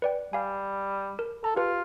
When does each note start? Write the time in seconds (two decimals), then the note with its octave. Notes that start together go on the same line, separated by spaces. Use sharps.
0.02 B4 D5 G5
0.33 G3 F5 G#5
1.19 A#4
1.44 A4 A#5
1.57 F4 G4 B4